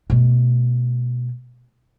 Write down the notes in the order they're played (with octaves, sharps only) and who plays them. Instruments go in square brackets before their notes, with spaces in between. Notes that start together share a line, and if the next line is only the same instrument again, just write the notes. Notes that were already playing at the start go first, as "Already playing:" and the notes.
[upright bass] B2 A3